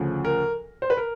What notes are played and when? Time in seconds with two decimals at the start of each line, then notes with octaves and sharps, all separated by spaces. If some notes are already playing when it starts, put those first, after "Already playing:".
Already playing: D2 C#3 F3
0.25 A#4
0.82 C5
0.90 B4
0.97 A#4